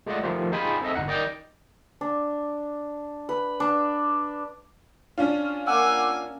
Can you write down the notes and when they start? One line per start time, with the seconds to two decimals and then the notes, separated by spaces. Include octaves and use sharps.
0.06 G#3 A3 F4 D5 D#5 F#5
0.23 D#3 F3 A3 F4 G4 C5
0.52 D#4 F4 G#4 G5 G#5 B5
0.81 C4 A4 D#5 E5
0.95 G1 D#4 F#5
1.07 D#3 D5 D#5 G5 D6 G6
2.01 D4
3.29 B4
3.60 D4
5.18 C#4 D4 F4
5.67 A#3 F#5 G#5 D6 E6